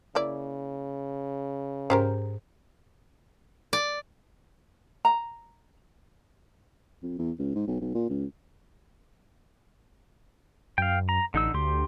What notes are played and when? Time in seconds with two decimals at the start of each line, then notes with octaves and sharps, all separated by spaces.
0.15 C#3 A#3 E4 D5
1.90 G#2 C#4 G4 A#4 C5 A#5
3.73 D5
5.05 A#5
7.03 F2
7.18 E2
7.39 C#2
7.55 G#2
7.67 B1
7.81 B1
7.94 A#2
8.09 C#2
10.78 F#2 F5 G5
11.09 A#5
11.34 A1 D3 D#4 E6
11.54 D2 G4 C6